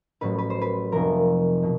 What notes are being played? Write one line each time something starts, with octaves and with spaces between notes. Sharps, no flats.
A1 A2 F#3 B4
B4
C5
B4
F1 F2 C3 F3 A#4
B2 F#3